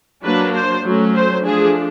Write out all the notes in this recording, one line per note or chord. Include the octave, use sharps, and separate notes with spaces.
F#3 A#3 D4 B4
C5
F#3 A3 C#4
C5
F3 A3 D4 G#4